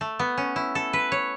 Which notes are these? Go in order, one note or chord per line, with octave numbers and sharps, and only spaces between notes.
A3
B3
C#4
E4
A4
B4
C#5